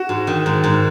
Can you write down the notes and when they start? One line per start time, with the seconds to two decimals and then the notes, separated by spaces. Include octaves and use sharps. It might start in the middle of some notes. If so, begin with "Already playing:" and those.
Already playing: F#4
0.09 G#2
0.27 D#3
0.46 G#2
0.64 G#2